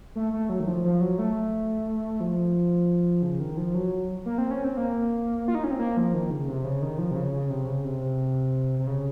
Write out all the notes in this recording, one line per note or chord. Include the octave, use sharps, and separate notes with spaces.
A3
A3
F#3
D#3
F3
F3
F#3
A3
F3
C#3
D#3
F3
F#3
A#3
C4
C#4
C4
A#3
F4
D#4
C#4
C4
A#3
F3
D#3
C#3
C3
C#3
D#3
F3
C3
C#3
C#3
C3
C#3
C3
C3
C#3